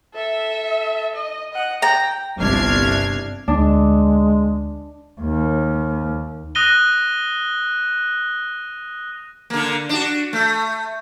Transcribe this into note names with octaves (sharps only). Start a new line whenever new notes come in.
A4 E5
D#5
D#5 F#5
G5 A#5
G1 C2 D4 F6 G#6 C7
D2 G#3 D4
D#2
D#6 F#6 A#6 D#7 G7
D3 A#3
D4 F#4
A3